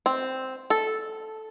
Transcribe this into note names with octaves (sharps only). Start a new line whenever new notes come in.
C4
A4